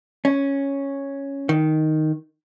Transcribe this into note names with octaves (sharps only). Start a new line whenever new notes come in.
C#4
D#3